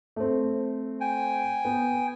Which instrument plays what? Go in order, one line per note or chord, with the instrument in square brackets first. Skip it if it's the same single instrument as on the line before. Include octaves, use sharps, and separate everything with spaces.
[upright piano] A3 C4
[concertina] G5 G#5
[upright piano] B3